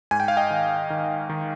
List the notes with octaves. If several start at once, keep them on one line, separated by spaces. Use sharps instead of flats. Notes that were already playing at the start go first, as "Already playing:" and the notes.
G#2 G#5
G5
F5
D#5 G5
D#3
D#3
D#3